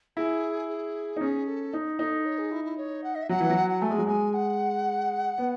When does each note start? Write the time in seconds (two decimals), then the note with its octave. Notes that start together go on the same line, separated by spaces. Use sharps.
0.17 E4 G#4
0.69 G#4
1.16 D#4
1.21 C#4 G#4
1.47 A4
1.73 D#4
1.99 D#4 A4
2.25 C#5
2.38 G#4
2.51 E4
2.65 E4
2.77 C#5
3.04 F#5
3.15 D#5
3.23 E5
3.29 F#3 F#5
3.40 E3
3.50 F#3
3.70 F#5
3.82 A3 G#5
3.91 G#3
3.98 F#3
4.07 G#3 G#5
4.34 F#5
5.38 B3